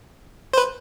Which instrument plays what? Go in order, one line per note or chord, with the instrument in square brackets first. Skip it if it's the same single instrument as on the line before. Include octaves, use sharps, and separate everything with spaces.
[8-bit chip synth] C5
B4